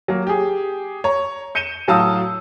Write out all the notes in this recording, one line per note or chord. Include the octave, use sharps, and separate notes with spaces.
F#3 A#3
G4 G#4
C#5 A#5
G6 C#7 D#7 E7 G7
A2 F#3 F5 A5 D#6 E6